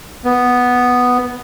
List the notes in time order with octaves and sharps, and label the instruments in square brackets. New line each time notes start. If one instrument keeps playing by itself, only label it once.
[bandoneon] B3